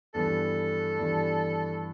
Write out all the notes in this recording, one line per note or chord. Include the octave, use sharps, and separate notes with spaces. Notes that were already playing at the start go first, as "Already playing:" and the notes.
G2 E3 B3 D4 A4
G2 E3 B3 D4